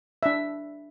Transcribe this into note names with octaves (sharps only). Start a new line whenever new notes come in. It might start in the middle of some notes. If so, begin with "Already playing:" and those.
D4 E5